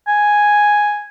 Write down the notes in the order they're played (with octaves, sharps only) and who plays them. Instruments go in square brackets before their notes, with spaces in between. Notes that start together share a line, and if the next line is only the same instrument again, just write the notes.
[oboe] G#5